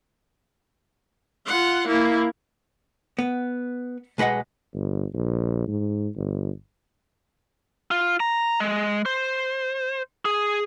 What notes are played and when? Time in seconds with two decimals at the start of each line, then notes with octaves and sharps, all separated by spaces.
1.46 F4 F#5
1.87 A#3 E4
3.19 B3
4.18 B1 G#3 B4 D#5 F#5
4.74 G1
5.14 A#1
5.67 G#2
6.16 G1
7.91 F4
8.20 A#5
8.60 G#3
9.06 C5
10.25 G#4